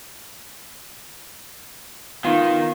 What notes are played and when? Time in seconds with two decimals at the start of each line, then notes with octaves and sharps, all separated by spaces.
2.25 D#3 B3 D#4 F4